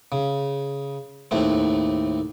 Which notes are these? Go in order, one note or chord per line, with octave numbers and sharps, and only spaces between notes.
C#3
D#2 A2 A3 C4